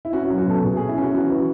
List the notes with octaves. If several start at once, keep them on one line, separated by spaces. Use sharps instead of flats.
E4
C#4 F#4
F#4
F#3
F#4
B2 A4
B2 G#4
C#4 G#4
E4
C#4 F#4
E3 F#4
E3